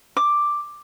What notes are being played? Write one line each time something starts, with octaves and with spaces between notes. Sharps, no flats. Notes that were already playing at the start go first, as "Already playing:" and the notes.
D6